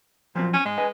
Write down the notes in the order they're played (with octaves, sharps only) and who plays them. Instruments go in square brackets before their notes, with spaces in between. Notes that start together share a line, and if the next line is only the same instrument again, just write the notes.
[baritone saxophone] A#2 [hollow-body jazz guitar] F3 F#3 C4
[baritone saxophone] C#4
[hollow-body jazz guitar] G#2 [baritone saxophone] G#3
[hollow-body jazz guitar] B4 D#5 G#5